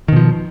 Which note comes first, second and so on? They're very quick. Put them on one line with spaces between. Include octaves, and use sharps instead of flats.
D#3 B2 F3